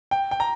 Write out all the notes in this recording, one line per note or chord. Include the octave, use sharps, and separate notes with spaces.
G5
G5
A#5